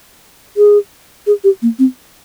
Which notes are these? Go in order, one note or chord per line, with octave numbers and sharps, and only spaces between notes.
G#4
G#4
G4
A#3
C4